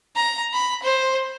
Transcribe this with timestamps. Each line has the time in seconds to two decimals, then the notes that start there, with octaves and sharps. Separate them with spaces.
0.16 A#5
0.53 B5
0.83 C5